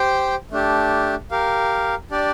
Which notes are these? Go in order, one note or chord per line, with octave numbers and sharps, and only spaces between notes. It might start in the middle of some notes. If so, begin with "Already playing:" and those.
Already playing: G4 C5 G5
A3 D4 G4
G4 A#4 F5
D4 G4 D5